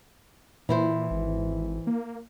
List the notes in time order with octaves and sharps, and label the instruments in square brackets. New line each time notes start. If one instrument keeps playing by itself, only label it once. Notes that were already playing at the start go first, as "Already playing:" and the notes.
[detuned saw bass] A#2 [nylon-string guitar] E3 E4 C5
[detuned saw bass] G#1
A#3